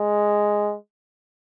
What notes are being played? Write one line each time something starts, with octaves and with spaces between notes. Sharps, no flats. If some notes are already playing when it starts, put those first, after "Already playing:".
Already playing: G#3